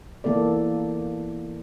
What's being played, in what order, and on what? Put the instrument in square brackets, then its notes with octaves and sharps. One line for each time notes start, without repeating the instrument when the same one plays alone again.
[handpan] E3 A#3 B3 A4 D5